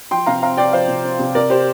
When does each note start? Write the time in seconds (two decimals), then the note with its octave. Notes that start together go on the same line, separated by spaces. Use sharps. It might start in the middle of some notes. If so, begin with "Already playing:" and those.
0.11 F3 G5 C6
0.26 C3 F5 A#5
0.42 C4 F5 A#5
0.57 C3 D5 G5
0.73 F3 C5 F5
0.88 C3
1.04 C4
1.19 C3
1.35 C3 A#4 D5
1.50 G4 C5